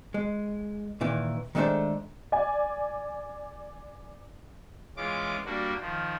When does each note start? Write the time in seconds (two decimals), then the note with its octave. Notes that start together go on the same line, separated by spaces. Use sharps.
0.14 G#3
1.01 A#2 D#3 E3
1.55 D#3 G#3 A3 D4 A4 C5
2.32 D5 G#5
4.97 E3 G#3 C#4 F4 D6
5.45 G3 A#3 D4 F#4
5.80 D#3 F3